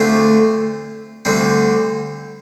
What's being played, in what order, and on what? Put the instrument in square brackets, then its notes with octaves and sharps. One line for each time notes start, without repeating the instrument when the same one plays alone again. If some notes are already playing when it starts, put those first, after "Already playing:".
Already playing: [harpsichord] D2 D3 A3 C4 F4
D2 D3 G3 C4